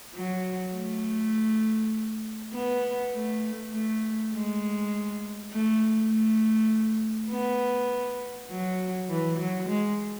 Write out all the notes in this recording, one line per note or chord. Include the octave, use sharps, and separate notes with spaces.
F#3
A3
B3
A3
A3
G#3
A3
A3
B3
F#3
E3
F#3
G#3